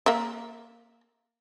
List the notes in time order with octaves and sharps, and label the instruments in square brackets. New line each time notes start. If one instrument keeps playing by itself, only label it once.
[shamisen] A#3 A#4 E5